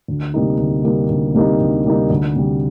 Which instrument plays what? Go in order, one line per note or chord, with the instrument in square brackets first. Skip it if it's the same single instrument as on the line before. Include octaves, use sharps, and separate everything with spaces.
[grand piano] D2
C3 G3 A#3 D#4
D2
C3 G3 A#3 D#4
D2
C3 G3 A#3 D#4
D2
C3 G3 A#3 D#4
D2
C3 G3